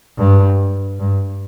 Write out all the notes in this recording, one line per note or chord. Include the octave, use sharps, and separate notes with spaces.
G2
G2